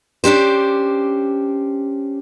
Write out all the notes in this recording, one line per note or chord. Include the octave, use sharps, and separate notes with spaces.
C#4 D4 G4 C5